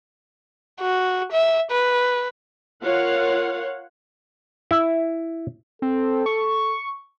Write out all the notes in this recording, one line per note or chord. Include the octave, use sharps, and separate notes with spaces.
F#4
E5
B4
F4 A#4 C#5 F5 F#5
E4
C4 A4
C#6